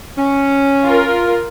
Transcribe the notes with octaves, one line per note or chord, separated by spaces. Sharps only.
C#4
F4 A#4